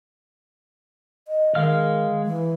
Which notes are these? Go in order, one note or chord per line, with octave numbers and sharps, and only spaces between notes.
D#5
D#3 G#3 F5 F6
E3